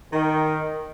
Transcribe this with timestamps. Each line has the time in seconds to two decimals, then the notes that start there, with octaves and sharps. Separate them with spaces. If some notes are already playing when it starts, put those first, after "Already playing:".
0.13 D#3